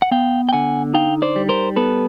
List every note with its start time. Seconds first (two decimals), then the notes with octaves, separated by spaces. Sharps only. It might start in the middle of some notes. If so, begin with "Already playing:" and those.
0.02 F#5
0.11 B3 F5 G5
0.49 G5
0.53 D3 F#5 G#5
0.94 D#4 F5 G5
1.22 C5 D5
1.36 G3
1.49 A#4 C5
1.76 B3 A4 B4